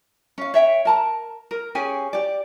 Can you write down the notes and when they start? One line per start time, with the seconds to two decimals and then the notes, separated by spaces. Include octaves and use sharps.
0.38 C#4 F5
0.54 C#5 E5 G5
0.85 A#4 A5 A#5
1.51 A#4
1.75 C#4 G4 G#4 G#5
2.13 G4 D5